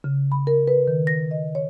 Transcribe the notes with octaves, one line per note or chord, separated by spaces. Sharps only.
C#3
B5
A#4
B4
D#3
A#6
D#5
C#5